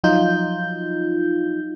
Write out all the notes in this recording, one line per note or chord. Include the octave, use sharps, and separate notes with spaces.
F3 F#3 D#4 F4 G6